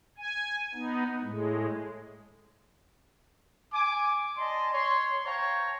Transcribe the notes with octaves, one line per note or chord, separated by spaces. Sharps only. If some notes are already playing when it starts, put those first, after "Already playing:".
G#5
B3 D#4
A2 G#3
G#5 D6
D5 D#5 G#5 A5 C6
C#5 C6
C5 C#5 F5 G5 A5 A#5